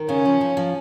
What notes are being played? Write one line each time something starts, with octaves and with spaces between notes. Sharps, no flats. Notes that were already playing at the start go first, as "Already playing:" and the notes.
Already playing: D#3
C#3 C#4
F3
F3
F3